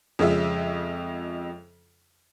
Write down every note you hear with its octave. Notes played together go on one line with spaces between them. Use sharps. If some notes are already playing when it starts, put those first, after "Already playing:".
F2 C#3 G#3 F4 E5